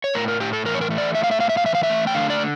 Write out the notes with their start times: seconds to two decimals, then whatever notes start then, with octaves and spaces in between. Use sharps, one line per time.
0.04 C#5
0.15 A2 A#4
0.28 A#4
0.40 A2 G4
0.53 A4
0.65 E3 A#4
0.75 C#5
0.81 A#4
0.91 A3
0.98 D5
1.14 A2 E5
1.24 F5
1.31 E5
1.39 A2 F5
1.49 E5
1.57 F5
1.65 E3 E5
1.75 F5
1.83 E5
1.90 A3
2.07 G5
2.14 D3 F5
2.30 D5
2.39 D3